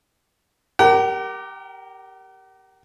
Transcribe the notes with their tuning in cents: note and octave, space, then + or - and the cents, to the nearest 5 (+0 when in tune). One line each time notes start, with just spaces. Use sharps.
G4 +0 A#4 +0 F#5 +45